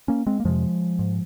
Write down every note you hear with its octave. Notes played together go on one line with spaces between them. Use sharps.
A#3 C#4
G#3 C4
A#3
F2 C3 F3 G#3
G#2